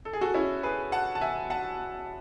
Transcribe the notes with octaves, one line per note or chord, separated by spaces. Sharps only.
A4
G#4
F#4 A4
C#4 E4
G#4 B4
F#5 A5
A5
E5 G#5
F#5 A5